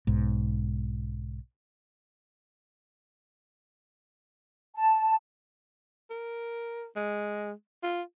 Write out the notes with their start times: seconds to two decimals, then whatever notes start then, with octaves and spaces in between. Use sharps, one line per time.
0.07 B1 G#2
4.75 A5
6.10 A#4
6.96 G#3
7.83 F4